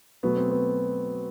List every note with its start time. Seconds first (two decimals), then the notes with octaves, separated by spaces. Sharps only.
0.23 B2 F#3 A3 B3
0.37 C4
0.51 B3